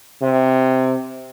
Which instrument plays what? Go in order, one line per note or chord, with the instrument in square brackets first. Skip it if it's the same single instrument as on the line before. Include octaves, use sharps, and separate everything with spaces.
[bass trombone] C3